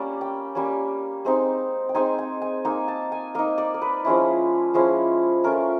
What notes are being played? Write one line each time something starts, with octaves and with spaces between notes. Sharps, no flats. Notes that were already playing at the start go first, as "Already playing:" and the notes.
Already playing: G3 A#3 C#4 D5
G5
G3 A#3 C#4
G#3 C4 D#4
G5
G#3 C4 D#4 G#5
G#5
G#5
A#3 D#4 G#5
A5
G#5
A#3 D#4 D#5
D5
A#4
B4
F3 G#3 C#4 E4
F3 G#3 C#4 E4
A3 C#4 F4 A#4